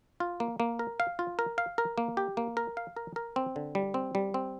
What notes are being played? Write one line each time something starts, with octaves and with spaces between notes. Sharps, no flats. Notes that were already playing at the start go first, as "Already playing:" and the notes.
F4
A#3
A#3
A#4
F5
F4
A#4
F5
A#4
A#3
G4
A#3
A#4
F5
A#4
A#4
C4
D3
G3
C4
G3
C4